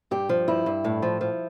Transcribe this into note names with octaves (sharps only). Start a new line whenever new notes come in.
G2 G4
F3
G2 E4
G2
A2
F3
F3